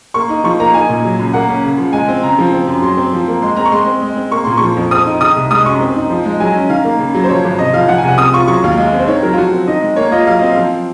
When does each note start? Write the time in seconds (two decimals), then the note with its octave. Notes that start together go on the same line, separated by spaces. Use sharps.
0.14 A#3 C#6
0.29 D#4
0.44 F3 C#6
0.60 A#3 A#5
0.74 D#4 G#5
0.89 A#2
1.04 F#3
1.19 C#2
1.34 A#3 F#5
1.48 C#4
1.64 C#3
1.78 F3
1.93 G#3 G#5
2.08 C4
2.23 C#3 A#5
2.39 F3
2.52 C4
2.67 F#2
2.82 F#3 C6
2.97 C4
3.13 F3
3.28 A#3
3.42 G#3 C6
3.57 C4 A#5
3.65 C#6
3.72 G#3 C6
3.86 C4
4.01 G#3
4.16 C4
4.32 A#3 C#6
4.44 A#2 C6
4.57 F3 C#6
4.77 F2
4.91 C4 D#6
5.06 D#4
5.20 D#3 D#6
5.36 C2
5.50 G#3 D#6
5.66 F#2 C#6
5.81 C4
5.96 D#4
6.10 F3
6.25 G#3
6.40 F#3 G#5
6.55 C#4
6.69 D#3 F5
6.85 A#3
6.99 C#3
7.14 F#3
7.24 C5
7.29 F3 C#5
7.44 G#1
7.58 C3 D#5
7.73 F3 F5
7.88 F3 F#5
7.98 G#5
8.04 C2 F#5
8.18 C4 D#6
8.33 F4 C#6
8.48 F#3 C#6
8.64 D#2 F5
8.77 G#3 F5
8.93 C4
8.99 C5
9.07 D#3 C#5
9.23 F#3 A#4
9.33 F4
9.38 F3 F#4
9.52 C4
9.67 D#3 D#5
9.82 G#3
9.96 A#3 C#5
10.12 F4 D#5
10.27 F#3 F5
10.39 C4 D#5
10.51 F5
10.57 F3